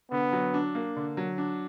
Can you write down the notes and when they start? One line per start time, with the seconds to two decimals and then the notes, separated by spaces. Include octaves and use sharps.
0.11 D3 B3
0.33 F#3
0.54 D4
0.75 A#3
0.96 D3
1.17 F#3
1.38 D4